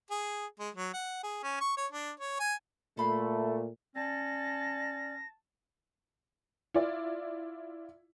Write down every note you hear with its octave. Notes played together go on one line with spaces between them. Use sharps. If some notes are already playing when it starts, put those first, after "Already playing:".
G#4
G#3
F#3
F#5
G#4
C#4
C#6
C#5
D4
C#5
G#5
A#2 A3 A4 B5 C6
C#4 D5 A5 A#6
E4 F4 D5